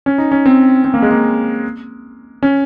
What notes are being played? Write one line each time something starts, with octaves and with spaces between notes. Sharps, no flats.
C#4
D#4
C#4
C4
C4
A#3
G#3
A#3
C#4